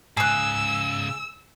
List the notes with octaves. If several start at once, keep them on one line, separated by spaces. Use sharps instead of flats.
G#2 C#3 G#4 E6 F#6